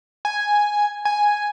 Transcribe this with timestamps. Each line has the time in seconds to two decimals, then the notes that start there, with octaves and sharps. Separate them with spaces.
0.25 G#5
1.05 G#5